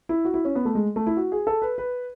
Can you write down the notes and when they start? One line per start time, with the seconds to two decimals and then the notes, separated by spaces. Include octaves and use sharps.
0.09 E4
0.25 F#4
0.34 E4
0.45 C#4
0.56 B3
0.65 A3
0.75 G#3
0.96 A3
1.07 E4
1.17 F#4
1.32 G#4
1.47 A4
1.62 B4
1.78 B4